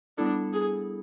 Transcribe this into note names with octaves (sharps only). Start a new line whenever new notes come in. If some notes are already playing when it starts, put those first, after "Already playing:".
G3 B3 D4 E4 A4
G#4